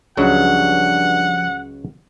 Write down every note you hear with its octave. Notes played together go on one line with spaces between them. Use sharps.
C#2 G2 C#3 F3 F#3 F#5